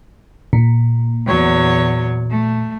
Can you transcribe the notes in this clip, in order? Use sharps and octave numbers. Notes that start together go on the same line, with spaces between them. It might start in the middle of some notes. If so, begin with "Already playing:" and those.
A#2
E2 F#3 C#5
A3